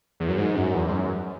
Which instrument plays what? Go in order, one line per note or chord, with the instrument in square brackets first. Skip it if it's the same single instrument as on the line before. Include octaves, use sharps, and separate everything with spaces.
[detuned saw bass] E2
F#2
G#2
F#2
E2
G#2
F#2